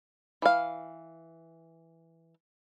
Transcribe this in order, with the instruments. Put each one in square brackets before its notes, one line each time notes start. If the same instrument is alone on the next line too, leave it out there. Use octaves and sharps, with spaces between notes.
[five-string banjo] E3 F5